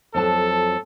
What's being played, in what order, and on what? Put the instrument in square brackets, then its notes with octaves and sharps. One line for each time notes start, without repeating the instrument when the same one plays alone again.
[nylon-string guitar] F2 F#3 A5 [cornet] A4